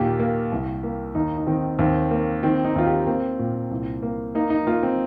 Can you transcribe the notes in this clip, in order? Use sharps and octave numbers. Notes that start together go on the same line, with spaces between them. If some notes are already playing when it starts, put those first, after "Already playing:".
Already playing: D#2 A#2 G4
A#3
C2
A#3
D#2 D#4
D#4
D#3 C4
D#2 C4
A#3
D#3 C4
D#4
D#2 F4
G4
A#3 C4
A#2
C2
A#3
A#3 D#4
D#4
A#3 F4
C4